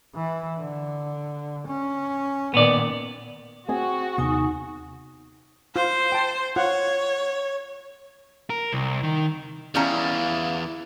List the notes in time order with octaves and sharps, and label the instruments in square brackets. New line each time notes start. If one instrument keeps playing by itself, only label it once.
[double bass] E3
D3
C#4
[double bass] A#2 D#3 [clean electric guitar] B3 D5
[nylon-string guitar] C4 G#4 [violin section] F#4
[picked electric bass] D#2 C3 B3 [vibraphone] D#4 G#5 D#6
[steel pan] F4 [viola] C5
[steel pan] G5 A5
[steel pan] F4 F#5 [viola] C#5
[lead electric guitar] A#4
C2
D#3
[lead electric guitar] E2 [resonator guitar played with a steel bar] G3 C#4 A#5 [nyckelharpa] E4 [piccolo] F5